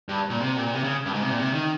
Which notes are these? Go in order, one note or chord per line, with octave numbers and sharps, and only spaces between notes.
G2
A#2
C3
A#2
C3
C#3
G2
G#2
C3
A#2
C3
D#3